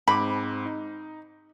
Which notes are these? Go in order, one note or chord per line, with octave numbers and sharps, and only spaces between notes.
G#2 C4 B5 D6
D#4